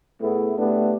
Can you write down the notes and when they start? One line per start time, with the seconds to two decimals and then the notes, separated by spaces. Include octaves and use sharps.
0.21 A2 A3 B3 E4 G#4
0.58 A2 A3 B3 D4 G4